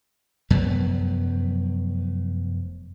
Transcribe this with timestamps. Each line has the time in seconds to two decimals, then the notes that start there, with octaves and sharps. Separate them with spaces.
0.50 F1 F#2 F#3 B3